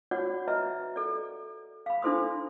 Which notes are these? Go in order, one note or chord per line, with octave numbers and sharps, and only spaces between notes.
F#4 C#5 D5 F#5
B4 D#5 E5 A#5
A4 D5
F5 B5
D4 E4 A4 C5 C6 D#6